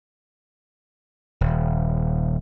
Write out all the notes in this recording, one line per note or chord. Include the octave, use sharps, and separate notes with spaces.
D#1